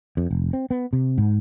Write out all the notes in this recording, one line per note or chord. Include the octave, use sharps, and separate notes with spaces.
F2
F1
C4
B3
C3
G#2